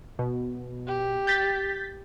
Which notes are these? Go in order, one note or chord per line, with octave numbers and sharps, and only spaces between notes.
B2
G4
G6 A6 B6